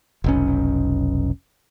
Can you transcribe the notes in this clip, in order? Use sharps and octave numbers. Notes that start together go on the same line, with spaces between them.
F1 B1 C#4